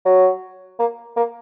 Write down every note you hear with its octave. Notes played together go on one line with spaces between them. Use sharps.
F#3
A#3
A#3